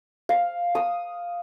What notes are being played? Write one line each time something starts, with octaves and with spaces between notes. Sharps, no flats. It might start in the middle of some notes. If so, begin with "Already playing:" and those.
F5
D#6